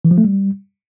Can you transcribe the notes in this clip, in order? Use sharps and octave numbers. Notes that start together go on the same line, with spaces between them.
E3
F3
A3
G3